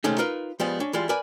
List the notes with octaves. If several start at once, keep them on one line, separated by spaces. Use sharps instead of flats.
C3 D#3 G#3 A3 C#4 D#4
D#4 F4 A#4 B4
F3 G3 G#3 B3
C#4 D4
E3 G3 G#3 F4
A#4 B4 D5 G#5 B5